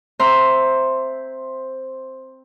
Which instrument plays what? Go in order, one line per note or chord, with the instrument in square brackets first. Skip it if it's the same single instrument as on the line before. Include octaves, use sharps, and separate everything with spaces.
[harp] C4 C5 E5 A#5 C6